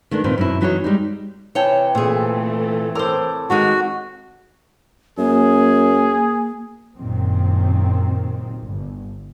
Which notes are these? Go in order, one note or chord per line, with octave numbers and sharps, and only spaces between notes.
D#3 A3 B3 D4
A#2 D#3 B3 C4 D#4
F#2 B2 E4
E3 F#3 D#4 F#4 A#4 C#5
G3 G#3 D#4
C3 E3 C#5 G5 A5
A#2 E3 A3 C4 G#4
A2 A4 A#4 C5 D6
D#3 G#3 D#4 F#4
F#2 A#3 G#4
F#1 F#2 A#2 D#3 C4
G1